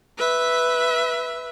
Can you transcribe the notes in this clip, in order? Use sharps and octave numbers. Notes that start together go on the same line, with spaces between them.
B4 E5